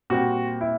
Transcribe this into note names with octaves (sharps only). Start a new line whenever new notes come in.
A#2 G3 C4 F#4
E4